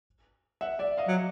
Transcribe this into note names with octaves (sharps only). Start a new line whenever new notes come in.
E5 F#5
D5 E5
D#5 F5
F#3